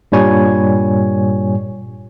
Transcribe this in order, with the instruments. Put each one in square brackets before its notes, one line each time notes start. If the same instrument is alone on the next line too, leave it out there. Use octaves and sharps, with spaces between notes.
[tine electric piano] G2 A#2 G3 C#5 G#5